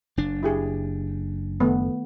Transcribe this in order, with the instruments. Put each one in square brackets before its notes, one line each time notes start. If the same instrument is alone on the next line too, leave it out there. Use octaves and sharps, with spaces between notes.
[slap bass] F#1 D4
[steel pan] E4 G4 G#4
D#3 A3 B3